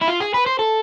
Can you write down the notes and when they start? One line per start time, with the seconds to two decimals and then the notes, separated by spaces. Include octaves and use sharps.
0.01 E4
0.08 F4
0.20 G#4
0.34 B4
0.46 C5
0.59 A4